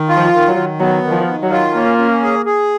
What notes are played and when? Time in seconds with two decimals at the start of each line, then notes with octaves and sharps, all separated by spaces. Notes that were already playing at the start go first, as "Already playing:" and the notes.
Already playing: D#3
0.09 F4
0.17 F3
0.33 D#3
0.48 F#3
0.56 D#3
0.80 F#3 B3
1.03 D#3
1.11 F3
1.27 D#3
1.43 F#3
1.51 F4
1.75 A#3 C#4
1.98 C#4
2.23 G#4
2.46 G#4